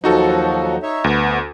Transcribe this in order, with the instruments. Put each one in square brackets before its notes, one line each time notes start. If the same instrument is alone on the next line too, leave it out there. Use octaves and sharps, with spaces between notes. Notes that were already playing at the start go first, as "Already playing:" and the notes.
[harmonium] D#2 F3 F#3 [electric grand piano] D#4 F#4 A4
[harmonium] D#4 C#5 E5
[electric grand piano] D2 [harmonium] B3